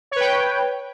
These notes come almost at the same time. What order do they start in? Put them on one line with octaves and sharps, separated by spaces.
C#5 B4 G5